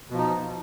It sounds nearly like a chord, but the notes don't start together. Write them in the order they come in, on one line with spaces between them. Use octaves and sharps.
B2 F3 D#4